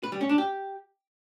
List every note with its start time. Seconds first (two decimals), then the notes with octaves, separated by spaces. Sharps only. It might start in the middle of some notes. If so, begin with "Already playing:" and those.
0.03 B4
0.12 G3
0.21 C#4
0.29 D4
0.38 G4